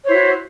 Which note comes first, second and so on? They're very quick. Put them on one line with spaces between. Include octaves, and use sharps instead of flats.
C#5 C5 E4 F#4